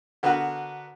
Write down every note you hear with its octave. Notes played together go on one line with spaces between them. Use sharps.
D3 B3 F#4 A#4 B4